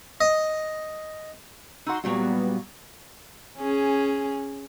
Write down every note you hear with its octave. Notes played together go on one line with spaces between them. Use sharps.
D#5
D#4 F#4 F#5 C6 E6
A#2 F#3 G3 B3 F#4
C#4 G#4